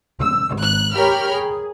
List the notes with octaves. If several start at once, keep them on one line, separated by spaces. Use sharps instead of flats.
E6
G#1 F#6
G4 A#4 C#5 G5 B5 F6
G#4